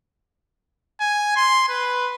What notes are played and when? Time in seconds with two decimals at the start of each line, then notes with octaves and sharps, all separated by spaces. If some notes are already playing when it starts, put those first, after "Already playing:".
1.00 G#5
1.36 C6
1.69 B4